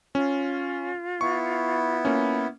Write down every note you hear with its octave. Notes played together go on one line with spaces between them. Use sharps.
C#4 F4
B3 E4 C#6
A#3 C#4